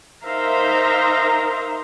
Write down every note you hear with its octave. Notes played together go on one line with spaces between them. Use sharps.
D#4 A#4 C5 E5 F5 A#5